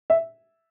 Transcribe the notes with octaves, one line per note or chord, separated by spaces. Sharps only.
E5